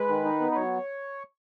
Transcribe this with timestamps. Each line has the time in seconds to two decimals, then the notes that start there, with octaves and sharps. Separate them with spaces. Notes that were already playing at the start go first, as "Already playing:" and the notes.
Already playing: G#3 B4
0.09 D#3
0.25 D#4
0.41 B3
0.52 B4
0.56 F#3 C#5